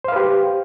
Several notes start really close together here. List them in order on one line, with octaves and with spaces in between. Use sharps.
C5 F5 B4 G4